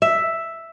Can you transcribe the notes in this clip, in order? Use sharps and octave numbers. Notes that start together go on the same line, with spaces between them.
E5